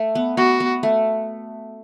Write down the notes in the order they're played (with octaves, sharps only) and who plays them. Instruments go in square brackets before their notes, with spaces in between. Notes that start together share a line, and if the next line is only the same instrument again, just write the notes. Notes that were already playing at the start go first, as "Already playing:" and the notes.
Already playing: [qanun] A3
B3
[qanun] B3 [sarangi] F#4
[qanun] B3
A3